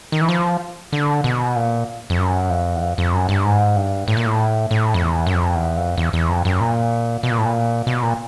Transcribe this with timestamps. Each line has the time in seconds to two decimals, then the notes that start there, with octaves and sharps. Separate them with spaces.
0.12 D#3
0.21 E3
0.29 F3
0.92 D3
1.24 B2
1.56 A#2
2.10 F2
2.19 F#2
2.50 F2
2.75 E2
2.81 F2
2.98 F2
3.13 F#2
3.29 G2
3.45 G#2
3.76 G2
4.08 A2
4.17 A#2
4.26 A2
4.71 A2
4.94 F2
5.02 E2
5.27 F#2
5.34 F2
5.55 E2
5.77 F2
5.98 E2
6.13 E2
6.29 F2
6.45 F#2
6.60 A#2
7.23 B2
7.31 A#2
7.38 A2
7.45 A#2
7.87 B2
8.03 A#2